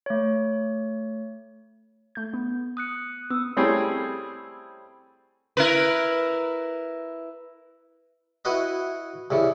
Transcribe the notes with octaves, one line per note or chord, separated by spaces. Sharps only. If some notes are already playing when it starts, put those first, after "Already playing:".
A3 C#5
A3 G6
B3
D#6 F#6 C#7
B3 D#6 E6
G3 A3 C4 C#4 E4 G#4
E4 A#4 B4
E4 F#4 B4 D#5
C2 C#3 E3